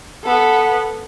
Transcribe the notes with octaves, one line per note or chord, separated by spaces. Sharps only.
B3 A4